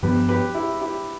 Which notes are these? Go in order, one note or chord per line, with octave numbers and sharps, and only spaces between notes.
G2 F3 B3 G4 B4
G4 B4
E4 G4
E4 G4